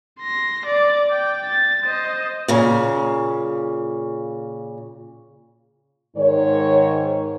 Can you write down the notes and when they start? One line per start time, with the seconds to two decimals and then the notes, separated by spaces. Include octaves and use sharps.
0.20 C6 A#6
0.67 D5
1.11 G5
1.45 A6
1.84 C5 D#5
2.48 A#2 C#3
6.17 G#2 D#3 C#5